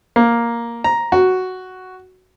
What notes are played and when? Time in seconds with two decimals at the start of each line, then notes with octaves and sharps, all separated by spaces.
0.16 A#3
0.84 A#5
1.12 F#4